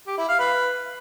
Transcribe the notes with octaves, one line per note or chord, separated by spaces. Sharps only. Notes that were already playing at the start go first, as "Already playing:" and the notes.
G4
E4
F5
B4